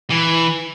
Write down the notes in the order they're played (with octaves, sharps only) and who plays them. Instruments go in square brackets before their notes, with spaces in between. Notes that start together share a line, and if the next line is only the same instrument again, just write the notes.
[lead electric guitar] E3